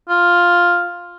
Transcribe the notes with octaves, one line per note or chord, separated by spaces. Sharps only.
F4